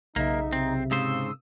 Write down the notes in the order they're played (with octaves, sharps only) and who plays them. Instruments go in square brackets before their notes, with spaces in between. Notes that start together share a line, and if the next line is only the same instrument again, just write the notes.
[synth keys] B1 C#3 E5 [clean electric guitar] A#3 [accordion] D#4
[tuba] C3 [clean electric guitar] C4
[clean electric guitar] G#2 C#3 C5 [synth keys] F5 [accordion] D#6 E6